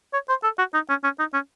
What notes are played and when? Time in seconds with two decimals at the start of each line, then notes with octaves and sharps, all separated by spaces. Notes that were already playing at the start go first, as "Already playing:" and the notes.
0.13 C#5
0.29 C5
0.44 A4
0.58 F#4
0.74 D#4
0.89 C#4
1.04 C#4
1.19 D#4
1.34 C#4